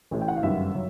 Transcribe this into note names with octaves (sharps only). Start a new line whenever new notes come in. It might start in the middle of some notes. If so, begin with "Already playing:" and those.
A1 A2 E3
G5
F#5
F5
G1 F#2 D#3 G3 E5
F#3